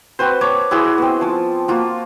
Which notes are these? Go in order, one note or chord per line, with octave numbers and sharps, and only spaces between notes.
C4 F#4 B4 C5
C#5 A5 D6
E4 F#4 G#4 C6
B3 C4
F3 A5
A#3 F4 F#4